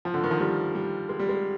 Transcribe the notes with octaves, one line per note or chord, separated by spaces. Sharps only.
F3
D3
D#3
F3
G3
G3
G#3
G3
G#3